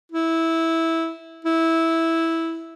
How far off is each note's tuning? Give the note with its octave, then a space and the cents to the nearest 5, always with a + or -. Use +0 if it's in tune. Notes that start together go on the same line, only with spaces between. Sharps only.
E4 -10
E4 -10